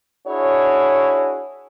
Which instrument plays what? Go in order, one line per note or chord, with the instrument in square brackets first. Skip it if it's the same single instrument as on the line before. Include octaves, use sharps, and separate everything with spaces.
[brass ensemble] D4 E4 F#4 G#4 C#5